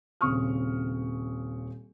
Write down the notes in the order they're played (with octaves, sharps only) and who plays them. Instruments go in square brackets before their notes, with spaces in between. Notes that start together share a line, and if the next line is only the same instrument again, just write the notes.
[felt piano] D#1 C#3 C4 C#6 D#6 F6